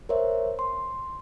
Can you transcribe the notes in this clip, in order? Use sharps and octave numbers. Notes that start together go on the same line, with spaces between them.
A#4 C5 C#5 E5
C6